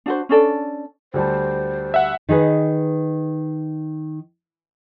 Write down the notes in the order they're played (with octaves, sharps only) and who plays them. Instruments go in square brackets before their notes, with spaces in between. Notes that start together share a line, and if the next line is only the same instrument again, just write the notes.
[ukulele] D4 F#4 C5
C#4 D4 A4 D5
[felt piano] D2 G3 A5 [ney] C5
[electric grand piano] E5 F#5
[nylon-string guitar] D#3 D#4 G#4 B4